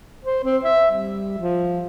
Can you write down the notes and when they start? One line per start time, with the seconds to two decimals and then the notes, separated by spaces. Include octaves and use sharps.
0.25 C5
0.44 C4
0.64 E5
0.91 G3
1.38 F3